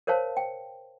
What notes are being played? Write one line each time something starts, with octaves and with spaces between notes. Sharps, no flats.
A#4 C5 C#5 F5 A5
G5